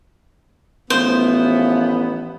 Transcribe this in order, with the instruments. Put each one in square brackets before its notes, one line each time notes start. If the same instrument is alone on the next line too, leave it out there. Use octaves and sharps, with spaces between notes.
[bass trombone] A1 [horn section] D#3 F3 A3 [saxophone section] B3 [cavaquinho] C5